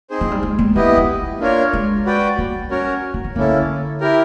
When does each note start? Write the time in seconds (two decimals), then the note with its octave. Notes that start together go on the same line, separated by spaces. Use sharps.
0.10 C4 D#4 G#4 C5
0.21 F3
0.32 G3
0.43 G#3
0.59 G#3
0.75 F#3 B3 E4 G4 B4 D#5
0.86 F3
0.97 F3
1.40 A#3 D4 F4 A#4 C#5
1.73 G#3
2.05 F#4 B4 D5 G5
2.38 G3
2.71 C#4 F#4 A#4 C#5
3.14 F3
3.24 E3
3.35 D3 A#3 C#4 E4 A4
4.01 E4 G4 A#4